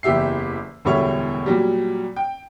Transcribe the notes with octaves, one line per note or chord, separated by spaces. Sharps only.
F#1 E2 G4 E5 C7
E1 D2 A2 G3 E4 C#5
A#2 F#3 G3
G5